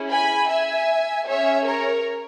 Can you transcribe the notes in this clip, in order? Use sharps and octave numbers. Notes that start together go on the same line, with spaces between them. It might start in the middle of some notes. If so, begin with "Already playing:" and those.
Already playing: C#4 E4 G#4
G#5 B5
E5 G#5
C#4 G#4 C#5 E5
A#4 C#5